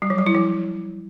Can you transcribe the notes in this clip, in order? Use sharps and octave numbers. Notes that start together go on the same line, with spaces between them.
G3
F#3
G3
E4
F3